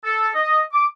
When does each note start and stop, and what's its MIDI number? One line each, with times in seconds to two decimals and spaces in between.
0.04 0.29 69
0.35 0.62 75
0.73 0.86 86